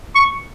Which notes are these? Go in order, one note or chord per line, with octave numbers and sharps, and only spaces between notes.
C#6